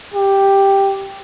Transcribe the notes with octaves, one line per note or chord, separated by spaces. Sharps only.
G4